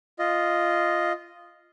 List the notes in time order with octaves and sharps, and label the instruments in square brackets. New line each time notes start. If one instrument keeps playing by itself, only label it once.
[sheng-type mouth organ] F4 D#5